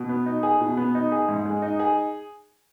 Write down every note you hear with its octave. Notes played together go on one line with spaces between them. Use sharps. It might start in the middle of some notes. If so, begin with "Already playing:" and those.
Already playing: B2
B3
D#4
G#4
B2
B3
D#4
G#4
G#2
G#3
D#4
G#4